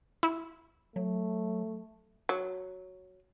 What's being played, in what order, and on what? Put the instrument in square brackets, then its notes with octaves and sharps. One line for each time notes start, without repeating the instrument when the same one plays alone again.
[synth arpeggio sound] E4
[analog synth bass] F#3 [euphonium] A3
[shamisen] F#3